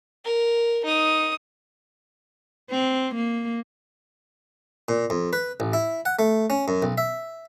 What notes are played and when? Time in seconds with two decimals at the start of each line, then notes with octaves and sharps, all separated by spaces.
0.25 A#4
0.85 D#4 D#6
2.71 C4
3.15 A#3
4.89 A#2
5.10 F2
5.33 B4
5.60 A1
5.73 E4
6.05 F#5
6.19 A3
6.50 C#4
6.68 F#2
6.82 B1
6.98 E5